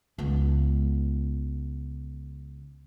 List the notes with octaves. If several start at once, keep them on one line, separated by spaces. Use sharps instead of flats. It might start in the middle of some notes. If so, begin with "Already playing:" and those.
C#2 B3